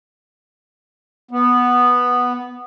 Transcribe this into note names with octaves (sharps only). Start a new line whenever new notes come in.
B3